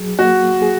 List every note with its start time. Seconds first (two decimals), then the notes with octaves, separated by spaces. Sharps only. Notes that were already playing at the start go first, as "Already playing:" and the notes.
Already playing: F#3 G#4
0.19 A#3 F#4
0.62 G#4